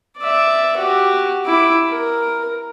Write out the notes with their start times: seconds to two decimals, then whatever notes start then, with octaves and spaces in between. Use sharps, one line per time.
0.18 D5 E5
0.77 F#4 G4
1.45 E4 D6
1.90 A#4